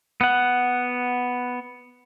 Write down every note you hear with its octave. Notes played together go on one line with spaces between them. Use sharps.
B3 F#5